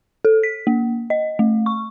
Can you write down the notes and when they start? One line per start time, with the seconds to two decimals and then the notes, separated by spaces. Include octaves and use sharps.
0.25 A4
0.43 B6
0.67 A#3
1.10 D#5
1.39 A3
1.66 C#6